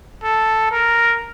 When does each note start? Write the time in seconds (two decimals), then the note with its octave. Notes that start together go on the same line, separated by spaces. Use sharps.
0.23 A4
0.72 A#4